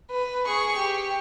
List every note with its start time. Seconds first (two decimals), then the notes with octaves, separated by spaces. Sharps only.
0.11 B4
0.47 G#4 C#6
0.77 G4